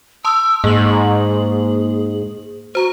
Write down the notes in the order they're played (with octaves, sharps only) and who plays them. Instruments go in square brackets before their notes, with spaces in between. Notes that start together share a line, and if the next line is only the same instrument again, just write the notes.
[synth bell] A5 C6 D#6 [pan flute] E6
[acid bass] G#2 [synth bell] A#3 F#7 [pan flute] G#4
[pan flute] F#4 [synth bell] C5 A#5